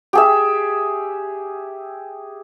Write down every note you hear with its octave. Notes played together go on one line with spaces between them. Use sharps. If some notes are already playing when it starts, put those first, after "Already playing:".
G4 G#4 E5